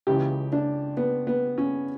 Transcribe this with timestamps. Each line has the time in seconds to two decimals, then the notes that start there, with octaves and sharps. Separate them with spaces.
0.07 C#2 C#3 E3 G4
0.53 D4
0.97 B3
1.27 B3
1.58 C#4